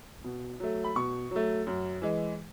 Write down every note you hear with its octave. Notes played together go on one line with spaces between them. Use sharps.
B2
F#3 A3
B5
B2 C#6
F#3 A3
F#2
E3 G#3